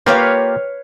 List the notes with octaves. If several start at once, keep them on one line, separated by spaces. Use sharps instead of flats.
A#3 F4 G4 B4 C#5 F5